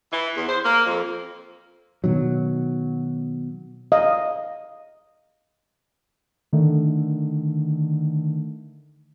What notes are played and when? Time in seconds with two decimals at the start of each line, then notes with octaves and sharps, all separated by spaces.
0.12 E3
0.35 E2
0.47 C5
0.64 A#3
0.86 F2
2.04 B2 D#3 F#3
3.92 D#5 F5
6.53 D3 D#3 A3